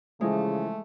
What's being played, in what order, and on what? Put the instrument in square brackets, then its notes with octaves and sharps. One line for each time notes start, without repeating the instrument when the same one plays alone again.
[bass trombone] C#3 [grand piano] E3 F3 [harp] G#3 [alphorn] A3